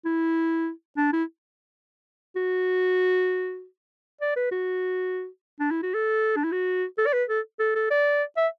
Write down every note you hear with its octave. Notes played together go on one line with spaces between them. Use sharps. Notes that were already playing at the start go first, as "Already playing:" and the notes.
E4
D4
E4
F#4
D5
B4
F#4
D4
E4
F#4
A4
D4
E4
F#4
A4
D5
B4
A4
A4
A4
D5
E5